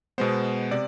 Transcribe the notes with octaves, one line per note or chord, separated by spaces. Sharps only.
B2 G#3 B3 C5
C3 D5